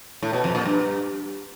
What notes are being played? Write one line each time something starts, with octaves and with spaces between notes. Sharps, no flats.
A2
B2
F2
A#2
G2